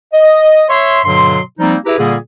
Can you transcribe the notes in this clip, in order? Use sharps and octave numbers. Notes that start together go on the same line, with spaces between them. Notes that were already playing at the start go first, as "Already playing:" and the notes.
D#5
C#5 E5 C6
G2 B2 D3 F#3 C6
F3 G3 A#3 C4 D#4
E4 G4 G#4 B4 E5 A#5
A#2 D3 G3 A#3 G#4